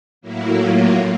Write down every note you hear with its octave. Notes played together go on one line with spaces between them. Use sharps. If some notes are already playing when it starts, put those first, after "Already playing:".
A2 F#3 A#3 E4
F4